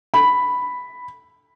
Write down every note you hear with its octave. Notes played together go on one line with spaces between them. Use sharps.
B5